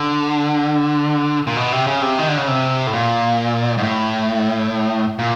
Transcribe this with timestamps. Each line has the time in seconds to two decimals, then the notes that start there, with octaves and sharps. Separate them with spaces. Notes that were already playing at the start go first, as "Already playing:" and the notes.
Already playing: D3
1.47 A#2
1.56 B2
1.72 C3
1.87 C#3
2.02 C3
2.19 D#3
2.29 D3
2.37 C#3
2.48 C3
2.87 A2
2.93 A#2
3.78 G#2
3.83 A2
5.19 A#2